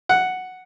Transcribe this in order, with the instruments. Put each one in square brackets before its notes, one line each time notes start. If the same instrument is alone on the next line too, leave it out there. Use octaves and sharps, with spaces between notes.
[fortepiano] F#5